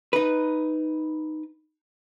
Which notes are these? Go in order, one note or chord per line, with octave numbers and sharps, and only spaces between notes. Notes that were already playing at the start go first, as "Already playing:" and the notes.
D#4 B4